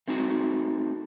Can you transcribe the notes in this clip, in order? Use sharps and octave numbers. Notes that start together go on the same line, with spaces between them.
A3 C4 D#4 F#4